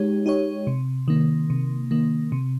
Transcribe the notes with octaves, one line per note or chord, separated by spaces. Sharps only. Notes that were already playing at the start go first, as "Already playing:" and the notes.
Already playing: G#3 D#4 G4 C#5
D#4 G4 C#5
C3
D#3 A#3
C3
D#3 A#3
C3